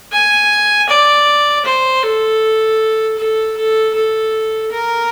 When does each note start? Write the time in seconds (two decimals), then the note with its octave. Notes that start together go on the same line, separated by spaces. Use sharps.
0.12 G#5
0.89 D5
1.65 C5
2.03 A4
3.18 A4
3.57 A4
3.94 A4
4.71 A#4